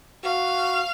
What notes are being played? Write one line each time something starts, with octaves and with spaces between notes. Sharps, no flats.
F#4 F5